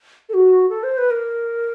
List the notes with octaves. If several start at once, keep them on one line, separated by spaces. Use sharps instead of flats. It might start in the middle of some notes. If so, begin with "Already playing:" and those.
A4
F#4
A4
C5
B4
A#4